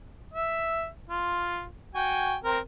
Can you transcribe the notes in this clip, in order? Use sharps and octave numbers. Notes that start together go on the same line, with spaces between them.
E5
F4
F#4 G5 G#5
C4 A#4